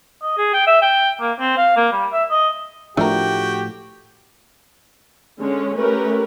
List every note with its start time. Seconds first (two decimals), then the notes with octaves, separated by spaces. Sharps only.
0.22 D#5
0.38 G#4
0.53 G5
0.67 E5
0.82 G5
1.21 A#3
1.40 C4
1.57 F5
1.76 A#3
1.92 G3
2.12 E5
2.31 D#5
2.97 A2 F3 A3 D4 F#4 G4 A#4 G5
5.39 D3 G#3 C#4 C#5
5.77 A3 C#4 G4 A#4 B4